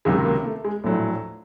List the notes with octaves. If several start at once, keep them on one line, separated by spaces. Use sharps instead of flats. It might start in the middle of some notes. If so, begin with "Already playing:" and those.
C#2 C3 D#3 F#3 G#3
A#3
A3
G#3
A#1 A2 F#3 A3